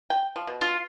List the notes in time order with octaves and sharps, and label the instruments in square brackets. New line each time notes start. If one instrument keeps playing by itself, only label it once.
[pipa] G5
F3
B2
[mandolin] F4